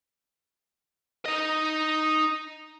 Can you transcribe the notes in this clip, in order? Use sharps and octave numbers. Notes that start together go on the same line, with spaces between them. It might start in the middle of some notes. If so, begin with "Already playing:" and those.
D#4 D#5